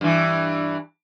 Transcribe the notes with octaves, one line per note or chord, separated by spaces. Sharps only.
G2 E3